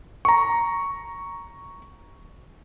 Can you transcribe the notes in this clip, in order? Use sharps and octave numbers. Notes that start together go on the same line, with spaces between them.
A#5 C#6